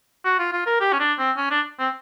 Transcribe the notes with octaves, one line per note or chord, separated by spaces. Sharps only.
F#4
F4
F4
A#4
G4
C#4
D4
C4
C#4
D4
C4